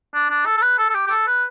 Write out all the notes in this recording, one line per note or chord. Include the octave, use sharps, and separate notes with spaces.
D4
D4
A4
A4
B4
A4
A4
G4
G4
A4
B4